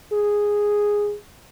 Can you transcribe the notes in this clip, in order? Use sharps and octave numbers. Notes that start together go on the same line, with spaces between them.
G#4